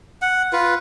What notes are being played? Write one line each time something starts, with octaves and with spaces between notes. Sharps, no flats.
F#5
F4 B4